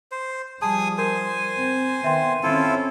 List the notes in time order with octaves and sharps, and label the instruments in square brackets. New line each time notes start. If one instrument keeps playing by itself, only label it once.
[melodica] C5
[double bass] F3 G3 [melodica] G#4 G#5 D#6 [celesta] A5
[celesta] A#4 [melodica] C5 G#5
[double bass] C4
[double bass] D#3 B3 [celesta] E5 G5 C6
[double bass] C4 C#4 [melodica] E4 F4 A4